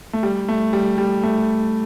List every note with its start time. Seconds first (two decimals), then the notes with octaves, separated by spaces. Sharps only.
0.13 A3
0.23 G3
0.48 A3
0.73 G3
0.98 G3
1.23 A3